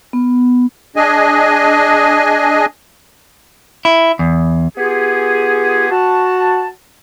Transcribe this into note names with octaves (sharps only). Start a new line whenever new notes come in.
B3
D4 G#4 D#5 G#5
E4
E2
B3 F4 G4 G#4
F#4 A5